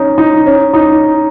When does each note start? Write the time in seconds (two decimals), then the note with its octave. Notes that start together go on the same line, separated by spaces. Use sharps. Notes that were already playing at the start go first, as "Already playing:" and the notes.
Already playing: C#4 D#4
0.18 D#4
0.46 C#4
0.74 D#4